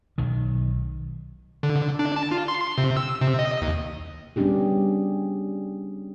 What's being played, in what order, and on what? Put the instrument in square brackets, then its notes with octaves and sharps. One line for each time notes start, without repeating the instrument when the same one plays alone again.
[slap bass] B1 D#3
[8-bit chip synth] D3
D4
A5
F4
C6
C3
E6
C3
D#5
D#2
[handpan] G3 B3 C#4 D4 G4 G#4